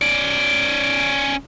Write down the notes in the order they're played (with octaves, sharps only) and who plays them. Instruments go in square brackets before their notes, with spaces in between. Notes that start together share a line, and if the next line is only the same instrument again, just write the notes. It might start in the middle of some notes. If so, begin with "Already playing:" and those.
[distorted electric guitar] C#4 D5